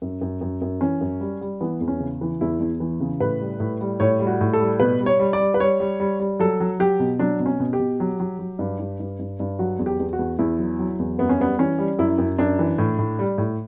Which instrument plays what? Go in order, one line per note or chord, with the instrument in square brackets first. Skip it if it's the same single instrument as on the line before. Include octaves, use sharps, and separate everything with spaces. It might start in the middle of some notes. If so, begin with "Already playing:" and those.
[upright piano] F#2
F#2
F#2
F#2
E3 C#4
F#2
G3
G3
E3 B3
E2
C#4
C#3
E3
E2 E4
E2
E3
C#3
A2 B4
G3
A2
G3
A2 C#5
G3
F#4
A2
A4
G3
B2 B4
G3
C#5
G3
D5
G3
B4
G3 C#5
G3
G3
G3
F#3 A4
F#3
F#3 G4
B2
F#3 D4
B2
C#4
B2
G4
B2
F#3
F#3
F#3
G2
G2
G2
G2
G2
F#3 F#4
E2
G4
E2
F#4
E2
E2 E4
F#3
F#3
E2
F#2 B3
C#4
G3 B3
E3 C#4
G3
F#2 E4
F#2
F#2 D4
E3
A2
A2
G3
A2